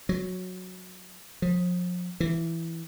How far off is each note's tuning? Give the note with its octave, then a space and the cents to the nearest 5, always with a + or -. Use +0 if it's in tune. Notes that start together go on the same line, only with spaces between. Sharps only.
F#3 -10
F3 +35
E3 +5